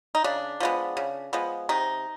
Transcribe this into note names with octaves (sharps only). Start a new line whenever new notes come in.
D#4
C#3 D4
F3 G#3 B3
C#3
F3 G#3 B3
C3 D#4